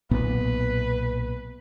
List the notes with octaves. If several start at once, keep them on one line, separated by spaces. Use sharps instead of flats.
B1 A#2 B3 B4